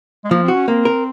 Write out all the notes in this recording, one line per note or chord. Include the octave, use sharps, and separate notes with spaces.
G#3
F3 A#3
C4
F#4
C#4
A#3 C4
A#4